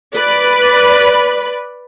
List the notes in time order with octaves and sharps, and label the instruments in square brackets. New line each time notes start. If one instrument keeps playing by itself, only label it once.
[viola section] B4 D5 B5